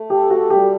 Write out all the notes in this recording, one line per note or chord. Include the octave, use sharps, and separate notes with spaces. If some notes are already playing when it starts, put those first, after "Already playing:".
Already playing: A3
G4 A4
F#4
G3 G4